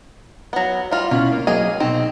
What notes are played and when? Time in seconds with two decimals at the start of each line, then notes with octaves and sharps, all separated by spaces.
0.53 F#3 B3
0.91 G3 F4
1.11 B2 C#4 E4 F4
1.32 A#3
1.47 F#3 A#3 G#4 D#5
1.80 B2 C4 D#4